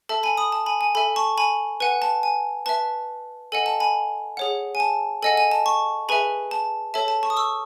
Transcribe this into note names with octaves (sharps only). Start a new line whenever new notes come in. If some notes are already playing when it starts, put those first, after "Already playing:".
A4 E5 A5
G#5 B5
B5 D#6
A5
G#5 B5
G#5
A4 E5 G#5 B5
A5 C#6
G#5 B5
B4 F#5 G#5
A5
G#5
B4 E5 A5
A4 D#5 F#5 G#5
A5
G#5 B5
G#4 C#5 F#5
G#5
A5
A4 D#5 F#5 G#5
G#5
A5
A5 C#6
G#4 B4 E5 G#5 B5
A5
A4 C#5 E5 A5
A5
A5 C#6
D#6
C#6 E6